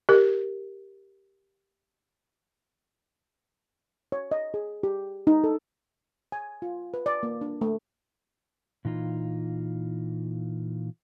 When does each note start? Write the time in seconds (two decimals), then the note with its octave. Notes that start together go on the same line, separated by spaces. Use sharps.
0.09 G4 A#4
4.12 C#5
4.32 D#5
4.54 G#4
4.83 G4
5.27 D#4
5.44 A4
6.32 G#5
6.62 F4
6.94 B4
7.06 D5
7.23 A#3
7.41 D4
7.61 A3
8.85 A#2 E3 D#4 F4